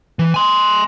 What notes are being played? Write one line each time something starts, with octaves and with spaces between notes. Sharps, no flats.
E3
G#5 C6